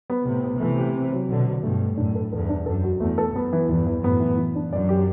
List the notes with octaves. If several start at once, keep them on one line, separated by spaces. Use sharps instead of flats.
B3
A2 C3 B3
B3
C3 E3 A3
G4
C4
F#3
B2 D3 F#3
F#3
G2 B2 A3
A3
F#2 A2 D4
A4
E2 G2 A4
D4
F#2 A4
F#4
E2 A3
A4
F#2 B3
E3
E2 G2 E3
E3
F#2 A2 B3
E3
E3
D4
F#2 D5
G4